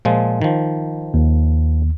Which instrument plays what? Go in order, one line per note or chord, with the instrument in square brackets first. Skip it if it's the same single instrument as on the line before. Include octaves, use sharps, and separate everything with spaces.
[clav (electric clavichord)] A#2 F3 G#3
D#3 F3
[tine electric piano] D#2